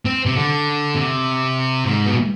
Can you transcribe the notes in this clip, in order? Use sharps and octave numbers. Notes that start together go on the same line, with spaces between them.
C4
C3
D3
C3
G#2
B2